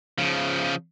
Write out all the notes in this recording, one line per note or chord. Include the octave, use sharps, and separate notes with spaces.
C#3 F3